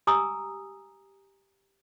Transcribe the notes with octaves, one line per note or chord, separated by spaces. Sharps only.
G4 G#5 A#5 D#6 E6